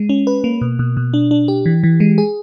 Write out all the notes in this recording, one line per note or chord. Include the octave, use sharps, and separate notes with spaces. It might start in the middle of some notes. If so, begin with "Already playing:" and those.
Already playing: G#3
C#4
B4
A#3
B2
B2
B2
D4
D4
G4
E3
E3
G#3
G#4